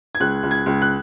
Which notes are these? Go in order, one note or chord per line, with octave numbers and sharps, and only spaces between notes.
G#6
C#2 F#6
C#2
G#6
C#2
F#6